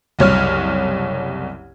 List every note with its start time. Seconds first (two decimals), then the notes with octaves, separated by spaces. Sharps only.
0.19 F#1 C2 C#5 F6